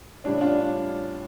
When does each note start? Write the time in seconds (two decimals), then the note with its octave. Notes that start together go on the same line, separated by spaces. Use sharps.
0.24 A2 G3 C#4 D4
0.41 D4 F4